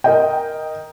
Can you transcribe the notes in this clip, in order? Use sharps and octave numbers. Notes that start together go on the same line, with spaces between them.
A#4 D#5 G5